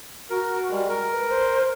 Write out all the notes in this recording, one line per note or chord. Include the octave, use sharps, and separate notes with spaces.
F#4 A#4
G3 G#3
A#4
B4
C5